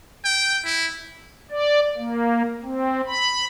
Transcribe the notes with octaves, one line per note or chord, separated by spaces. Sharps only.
G5
E4
D5
A#3
C4
B5